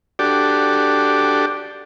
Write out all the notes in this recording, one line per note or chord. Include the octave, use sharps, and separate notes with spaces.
D4 F#4 G4 A4 D5